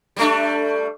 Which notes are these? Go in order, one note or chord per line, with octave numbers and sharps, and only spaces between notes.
G3 A3 D4